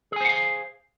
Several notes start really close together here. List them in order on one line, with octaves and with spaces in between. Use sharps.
G#4 G#5 C5 F#5 F5